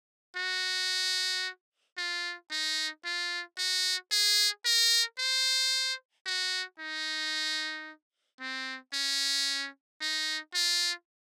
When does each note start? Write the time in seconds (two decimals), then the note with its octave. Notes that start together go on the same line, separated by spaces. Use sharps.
0.36 F#4
1.98 F4
2.51 D#4
3.04 F4
3.58 F#4
4.11 G#4
4.65 A#4
5.19 C5
6.26 F#4
6.79 D#4
8.40 C4
8.94 C#4
10.01 D#4
10.54 F4